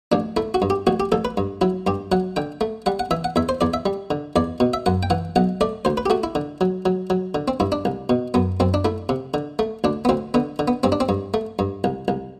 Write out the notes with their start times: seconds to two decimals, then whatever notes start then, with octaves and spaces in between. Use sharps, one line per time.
0.12 A1 D4
0.37 A3 E4
0.54 F#4
0.62 G2
0.70 G4
0.87 A1 F#4
1.00 G4
1.12 A1 A4
1.25 B4
1.37 G2
1.61 F#3 E4
1.87 G2 G4
2.12 F#3 F#5
2.36 D3 G5
2.61 A3
2.86 G3 F#5
2.99 F#5
3.11 E3 E5
3.24 F#5
3.36 E2 E5
3.49 C5
3.61 E2 D5
3.74 E5
3.86 G3
4.10 D3
4.36 E2 D5
4.60 B2
4.74 E5
4.86 F#2 F#5
5.03 G5
5.10 E3 F#5
5.36 B1 F#5
5.61 A3 D5
5.85 D2 C5
5.97 B4
6.06 G4
6.10 A3 F#4
6.24 E4
6.35 D3
6.61 F#3
6.85 F#3
7.10 F#3
7.35 D3
7.48 C4
7.60 G2 E4
7.72 D4
7.85 C2
8.09 B2
8.34 F#2 B3
8.60 F#2 C4
8.74 D4
8.85 A3 E4
9.09 C3
9.34 D3
9.59 A3
9.84 D2 D4
10.05 B3
10.09 D2 C4
10.34 D3 B3
10.59 D3
10.68 B3
10.83 G2 C4
10.92 D4
11.00 C4
11.09 G2
11.34 A3
11.59 G2
11.84 C2
12.08 C2